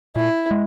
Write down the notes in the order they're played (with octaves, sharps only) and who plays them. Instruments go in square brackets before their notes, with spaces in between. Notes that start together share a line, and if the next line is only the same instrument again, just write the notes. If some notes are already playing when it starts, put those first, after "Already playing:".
[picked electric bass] A#2 [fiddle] E4
[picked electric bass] G#3